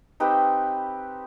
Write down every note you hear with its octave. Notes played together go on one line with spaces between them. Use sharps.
C4 D#4 G4 B4